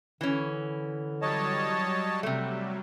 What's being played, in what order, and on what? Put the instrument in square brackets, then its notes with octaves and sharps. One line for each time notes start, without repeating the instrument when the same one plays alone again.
[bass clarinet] D3 [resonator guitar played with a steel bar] E3 C#4
[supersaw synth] F#3 G3 [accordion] C#5 D#5 A5
[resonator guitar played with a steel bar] C3 A3